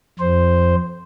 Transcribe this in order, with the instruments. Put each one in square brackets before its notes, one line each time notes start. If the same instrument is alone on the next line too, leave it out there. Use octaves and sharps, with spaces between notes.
[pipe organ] F2 C5